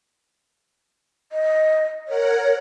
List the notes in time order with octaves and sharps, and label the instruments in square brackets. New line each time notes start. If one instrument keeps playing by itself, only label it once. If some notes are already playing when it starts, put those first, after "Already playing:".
[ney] D#5
[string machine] A#4 F#5 [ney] C#5